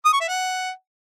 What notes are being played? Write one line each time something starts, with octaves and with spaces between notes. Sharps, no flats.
D#6
C#6
E5
F#5